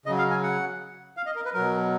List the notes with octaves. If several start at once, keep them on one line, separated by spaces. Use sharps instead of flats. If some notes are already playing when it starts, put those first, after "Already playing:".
C#3 F#3 D#5
F5
G#5
F#5
F5
D#5
A#4
B4
B2 F#3 A#4